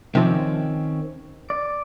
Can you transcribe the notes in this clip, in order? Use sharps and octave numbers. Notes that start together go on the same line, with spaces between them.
C3 D#3 F3 C4 C#4
D5